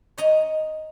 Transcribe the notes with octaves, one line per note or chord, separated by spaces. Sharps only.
C#5 D#5 A#5